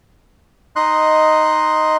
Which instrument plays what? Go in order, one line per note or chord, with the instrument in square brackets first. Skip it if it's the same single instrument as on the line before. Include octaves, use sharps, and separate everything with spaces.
[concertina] D#4 D#5 C6 F#6